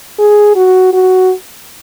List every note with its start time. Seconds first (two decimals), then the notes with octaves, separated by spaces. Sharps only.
0.19 G#4
0.56 F#4
0.93 F#4